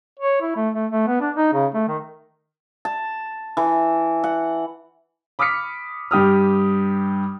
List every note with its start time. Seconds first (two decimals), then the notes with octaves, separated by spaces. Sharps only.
0.19 C#5
0.41 E4
0.56 A3
0.75 A3
0.91 A3
1.07 B3
1.21 D4
1.36 D#4
1.53 C#3
1.74 A3
1.88 D#3
2.85 A5
3.57 E3
4.24 F#5
5.39 B5 D6 D#6 F6 B6 C#7
6.11 G2 G4 D#6 F6